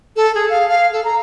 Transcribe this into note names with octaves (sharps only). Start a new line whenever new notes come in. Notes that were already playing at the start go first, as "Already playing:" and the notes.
A4
G#4
F5
F5
A4
A#5